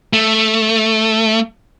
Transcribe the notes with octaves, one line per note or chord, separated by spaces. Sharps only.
A3